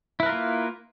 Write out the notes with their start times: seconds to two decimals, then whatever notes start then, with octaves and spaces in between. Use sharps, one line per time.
0.20 E4
0.23 B4
0.26 A#4
0.29 F4
0.32 A#3